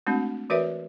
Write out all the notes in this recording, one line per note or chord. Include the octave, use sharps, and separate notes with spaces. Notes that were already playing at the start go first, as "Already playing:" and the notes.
G#3 A3 C4 D4 F#4
E3 F#4 A#4 B4 C#5 E5